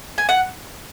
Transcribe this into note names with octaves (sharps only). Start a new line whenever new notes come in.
G#5
F#5